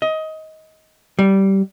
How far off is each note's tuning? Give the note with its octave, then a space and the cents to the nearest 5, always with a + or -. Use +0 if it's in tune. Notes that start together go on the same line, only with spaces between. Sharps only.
D#5 +20
G3 -15